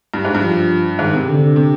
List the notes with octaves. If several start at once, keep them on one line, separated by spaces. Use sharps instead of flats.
G2
G#2
G2
F3
G#2 D#3
C3
D3
C3